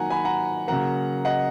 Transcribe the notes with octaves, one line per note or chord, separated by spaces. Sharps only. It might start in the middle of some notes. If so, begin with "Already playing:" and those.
Already playing: D#3 F#3 A#3 F#5 G#5 A#5
G#5 B5
F#5 A#5
C#3 F#3 A#3 F#5 A#5
D#5 F#5